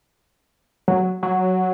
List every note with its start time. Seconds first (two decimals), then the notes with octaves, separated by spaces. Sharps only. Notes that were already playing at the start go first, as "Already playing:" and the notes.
0.88 F#3
1.23 F#3